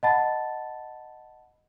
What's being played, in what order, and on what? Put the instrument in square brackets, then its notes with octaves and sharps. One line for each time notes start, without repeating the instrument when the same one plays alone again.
[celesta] D#5 F#5 A5 B5 A6